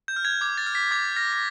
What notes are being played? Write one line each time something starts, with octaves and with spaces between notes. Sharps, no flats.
G6
F6
G#6
D6 G#6
A6
F6
B6
D6 G#6
F6 A#6
A#6